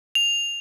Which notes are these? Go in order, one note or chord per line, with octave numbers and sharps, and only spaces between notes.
F7